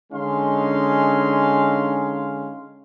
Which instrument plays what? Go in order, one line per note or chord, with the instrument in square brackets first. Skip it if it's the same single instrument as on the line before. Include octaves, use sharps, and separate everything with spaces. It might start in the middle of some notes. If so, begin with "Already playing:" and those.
[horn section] D3 G#3 C#4 D#4 F5 C6